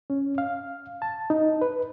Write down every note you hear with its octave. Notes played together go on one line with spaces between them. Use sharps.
C#4
F5
A5
D#4
B4